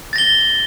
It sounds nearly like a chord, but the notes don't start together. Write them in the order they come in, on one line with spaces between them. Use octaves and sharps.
A6 A#6 G7